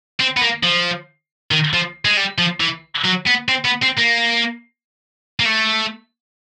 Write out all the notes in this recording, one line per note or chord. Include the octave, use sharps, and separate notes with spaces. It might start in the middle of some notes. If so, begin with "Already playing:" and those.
C4
B3
A#3
F3
D#3
F3
G#3
G3
F3
E3
F#3
B3
C4
B3
C4
A#3
A#3
A3